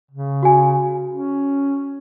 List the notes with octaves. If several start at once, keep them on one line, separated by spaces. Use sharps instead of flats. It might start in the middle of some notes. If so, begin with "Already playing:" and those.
C#3
F#4 G#5
C#4